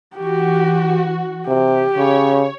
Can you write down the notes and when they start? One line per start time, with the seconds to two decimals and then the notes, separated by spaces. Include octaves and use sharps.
0.16 E3 F#4 G4
1.48 C3 G4
1.98 C#3 C#5